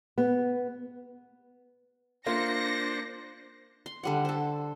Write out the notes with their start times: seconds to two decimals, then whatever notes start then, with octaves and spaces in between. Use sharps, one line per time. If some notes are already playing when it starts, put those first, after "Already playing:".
0.18 B3
2.26 A#3 D4 F4 C5 A#6 C#7
3.86 C6
4.03 D3 G3 F#5
4.25 A4 C5